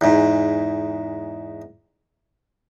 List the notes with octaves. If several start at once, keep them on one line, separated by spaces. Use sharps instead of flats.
E2 G#2